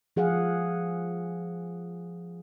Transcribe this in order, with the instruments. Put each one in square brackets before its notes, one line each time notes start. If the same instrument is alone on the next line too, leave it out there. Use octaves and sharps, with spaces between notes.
[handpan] F3 G#4 F5 F#5